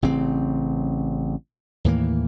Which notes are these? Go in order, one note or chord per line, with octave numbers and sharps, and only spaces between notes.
A1 C#3 C4
D#2 A2 E3 A#3